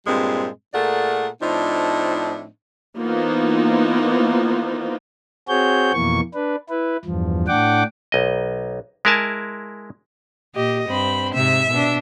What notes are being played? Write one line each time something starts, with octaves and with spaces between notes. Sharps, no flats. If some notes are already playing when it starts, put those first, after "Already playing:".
G2 A#2 G3 G#3 C4
A#2 A3 G#4 A#4 D5 F#5
A2 F3 C4 D4 D#4
E3 A#3 B3 D#4 F4 C5
C4 F#4 G#4 C#5 G6
F2 B2 E3 A#3 C#6
D4 B4
E4 B4
E2 G2 F3
A2 D4 F#5 G5 D6
B1 D#5
G#3 E4 A#4 G#5 A5
A#2 G4 D#5
G2 C4 B5
G#2 C3 E5
B2 D4